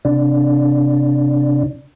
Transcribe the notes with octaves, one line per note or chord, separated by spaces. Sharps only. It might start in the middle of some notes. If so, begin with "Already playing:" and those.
C3 D4